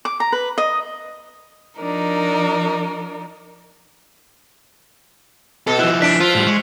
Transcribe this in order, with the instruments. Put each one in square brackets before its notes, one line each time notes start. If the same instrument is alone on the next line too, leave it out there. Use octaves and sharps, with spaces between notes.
[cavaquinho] D6
A#5
B4
D#5
[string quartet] F3 D4 D#4 A#4
[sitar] B2 [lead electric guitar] A4
[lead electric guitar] F3 E4 [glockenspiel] E6 F#6 E7
[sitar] D4 [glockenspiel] B6 D7
[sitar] F3 [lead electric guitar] F4
[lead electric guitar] A2 G3 [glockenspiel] F7 F#7
[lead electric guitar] G#3 [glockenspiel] C#6 B6 C#7